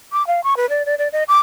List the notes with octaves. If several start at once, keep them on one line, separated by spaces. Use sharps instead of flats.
D6
F5
C#6
B4
D5
D5
D5
D#5
D6